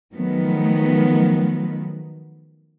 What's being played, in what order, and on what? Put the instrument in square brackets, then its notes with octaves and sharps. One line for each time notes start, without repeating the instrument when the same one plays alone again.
[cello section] D#3 F3 F#3 A3 B3